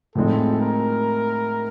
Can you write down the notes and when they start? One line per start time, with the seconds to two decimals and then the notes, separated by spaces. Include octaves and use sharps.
0.15 A2 F3 G#3 C4 D#4 A4
0.61 A#4